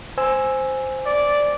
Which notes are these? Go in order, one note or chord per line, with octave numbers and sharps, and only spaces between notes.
C5 G#5 E6
D5